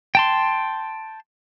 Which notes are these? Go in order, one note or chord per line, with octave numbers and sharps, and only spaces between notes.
G5 A5 C6